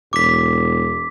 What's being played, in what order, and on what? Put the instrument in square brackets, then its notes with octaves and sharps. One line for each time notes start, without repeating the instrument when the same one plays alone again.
[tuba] E1 [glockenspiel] D6 B6